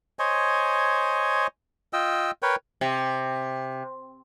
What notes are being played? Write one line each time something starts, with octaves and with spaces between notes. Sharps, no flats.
C5 C#5 D#5 G#5
F4 D#5 G5 E6
A#4 B4 C#5 G5
C3